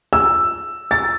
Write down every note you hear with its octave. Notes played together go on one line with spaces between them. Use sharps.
E6
A6